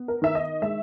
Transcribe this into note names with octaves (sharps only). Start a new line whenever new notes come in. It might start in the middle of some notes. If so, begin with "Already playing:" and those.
Already playing: B3
A#4
D#3 E5
D#5
G#3 E5